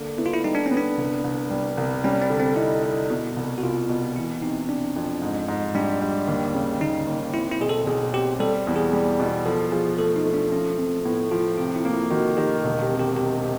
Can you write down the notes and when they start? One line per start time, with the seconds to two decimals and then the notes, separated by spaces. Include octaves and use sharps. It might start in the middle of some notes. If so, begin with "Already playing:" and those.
Already playing: D3 A#3
0.18 B3 E4
0.26 F4
0.33 E4
0.44 G3 D#4
0.55 D4
0.66 C#4
0.71 B3
0.77 D4
0.98 C2
1.24 C2
1.51 G3
1.77 C2
2.04 G3 C#4
2.22 C4
2.30 D3
2.39 C4
2.56 D#4 E4
2.83 D#4
3.10 B2
3.37 C2
3.58 F#4
3.63 C2 F4
3.89 B2
4.16 E3 E4
4.42 C3 D#4
4.69 C3 D4
4.96 F2
5.22 G#2
5.48 G#2
5.75 G3 D4
6.01 G3
6.28 D#2
6.55 C#3
6.81 D#2 D#4
7.07 D#2
7.34 C4 E4
7.52 E4
7.60 B1 G#4
7.69 A4
7.87 B1 G#4
8.13 C4 G4
8.40 G3 A4
8.67 E2
8.76 G#4
8.93 G3
9.20 B2
9.46 F3 A4
9.72 F3 G#4
9.99 A3 A4
10.16 D#4
10.25 A3
10.34 D4
10.52 F3 C#4
10.78 F3 C4
11.05 A2 B3
11.31 F3 F4
11.57 C3 F4
11.76 E4
11.85 A#3
11.93 E4
12.11 D#3 F#4
12.37 D#3 G4
12.64 E1
12.82 G4
12.91 C3
12.99 G4
13.16 C3 G4
13.43 C3